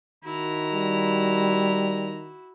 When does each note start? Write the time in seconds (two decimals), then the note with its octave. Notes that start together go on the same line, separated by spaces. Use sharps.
0.25 D#3 E4 F#4 A#5
0.73 G3